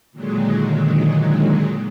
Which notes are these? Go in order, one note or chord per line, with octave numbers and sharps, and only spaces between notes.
A#2 D3 D#3 F#3 G#3